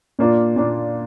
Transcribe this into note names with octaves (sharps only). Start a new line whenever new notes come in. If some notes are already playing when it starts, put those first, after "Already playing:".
A#2 A#3 D4 F4
A#2 A#3 D4 F4